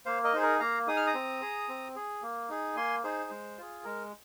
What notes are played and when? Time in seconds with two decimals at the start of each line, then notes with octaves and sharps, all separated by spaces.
0.06 A#3 C5 F5
0.24 A#4 D#5
0.33 D#4 G#4 C5
0.43 A#4
0.60 A#3 F5 A#5
0.87 D#4 G#4 D#6
0.97 F6
1.07 A#5 D#6
1.14 C4
1.42 G#4
1.69 C4
1.96 G#4
2.23 A#3
2.49 D#4 G#4
2.76 A#3 G#5 C6
3.04 D#4 G#4 C5
3.31 G#3
3.58 F4 G#4
3.84 G#3 A#4